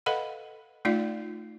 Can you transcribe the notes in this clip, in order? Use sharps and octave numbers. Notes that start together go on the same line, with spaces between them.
A4 B4 D#5 F5 F#5 B5
A3 D#4 F4 D5 F5